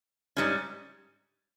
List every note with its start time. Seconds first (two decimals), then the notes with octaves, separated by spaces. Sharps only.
0.37 G#2 G3 C#4